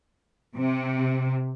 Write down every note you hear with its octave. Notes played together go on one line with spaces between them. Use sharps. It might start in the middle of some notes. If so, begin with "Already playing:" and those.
C3